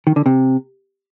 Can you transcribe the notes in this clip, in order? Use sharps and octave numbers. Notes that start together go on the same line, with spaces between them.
D#3
D3
C3